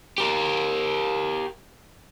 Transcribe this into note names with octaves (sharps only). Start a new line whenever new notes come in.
G4 A#4